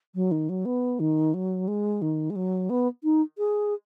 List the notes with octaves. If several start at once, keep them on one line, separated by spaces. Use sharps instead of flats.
F#3
D#3
F#3
B3
D#3
F#3
G#3
D#3
G#3
F#3
B3
D#4
G#4